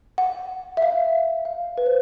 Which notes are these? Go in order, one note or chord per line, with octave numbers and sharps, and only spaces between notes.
F#5
E5
F5
F5
B4
C5